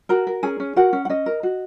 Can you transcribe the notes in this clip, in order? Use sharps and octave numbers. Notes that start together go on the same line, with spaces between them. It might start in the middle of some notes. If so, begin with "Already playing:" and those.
F#4 A#4 A#5
A#4
C#4 G#4 G#5
C#4
F#4 A#4 F#5
C#4
F#5
C#4 D#5
A#4
F#4